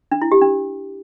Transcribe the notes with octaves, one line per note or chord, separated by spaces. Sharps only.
D4
E4
G4
D4